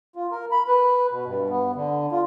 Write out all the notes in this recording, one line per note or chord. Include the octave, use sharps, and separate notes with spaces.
F4
A#4
B5
B4
B2
G2
B3
D3
F4